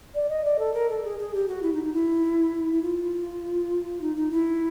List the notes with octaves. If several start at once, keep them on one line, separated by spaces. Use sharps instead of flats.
D5
D#5
D5
A4
A#4
A4
G#4
G#4
G4
F#4
E4
D#4
D#4
E4
E4
F4
D#4
D#4
E4